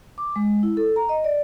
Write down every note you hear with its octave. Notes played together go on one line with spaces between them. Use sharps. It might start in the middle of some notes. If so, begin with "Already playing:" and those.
D6
G#3
E4
A4
A#5
D#5
D5